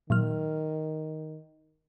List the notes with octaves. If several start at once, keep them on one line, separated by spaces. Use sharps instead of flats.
A#2 D#3 F#3 F6